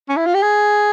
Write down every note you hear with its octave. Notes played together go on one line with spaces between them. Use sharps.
C#4
E4
F4
G4
G#4